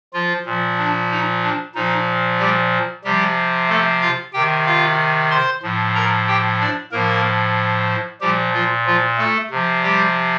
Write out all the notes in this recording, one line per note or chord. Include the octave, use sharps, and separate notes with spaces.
F3 F4
A#2 F3
D4
D#4
D4
A#2 F3 D#4
G3 G4
C3 F3 G3 G4
A3 A4
F4 F5
C3 D#3 G4 G5
F4 F5
C5 C6
A2 F3
A#4 A#5
G4 G5
D4 D5
A2 F3 A#3 A#4
A#2 F3 G3 G4
F3 F4
F3 F4
A3 A4
C3 F3
G3 G4